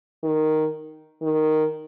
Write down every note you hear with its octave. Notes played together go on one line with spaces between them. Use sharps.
D#3
D#3